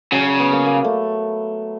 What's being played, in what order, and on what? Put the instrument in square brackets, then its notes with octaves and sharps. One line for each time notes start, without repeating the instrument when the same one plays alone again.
[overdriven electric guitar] C#3 [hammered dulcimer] F#3
[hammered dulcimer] B3
A#3
A#3
A3